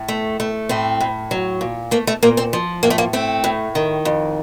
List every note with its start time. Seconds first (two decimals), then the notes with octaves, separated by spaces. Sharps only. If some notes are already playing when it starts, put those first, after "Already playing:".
Already playing: A2
0.08 A3
0.40 A3
0.69 A2 C4
1.01 A2
1.31 F#3
1.61 A#2
1.91 A3 A#3
2.07 A3
2.23 A#2 A#3
2.37 C4
2.53 F3
2.83 A2 A#3
2.90 A3
2.98 A#3
3.13 A3 C4
3.44 A2
3.75 D#3
4.05 F2